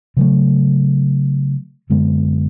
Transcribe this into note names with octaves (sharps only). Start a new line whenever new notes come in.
C#3 F#3 A3
F#2 D3 G#3 B3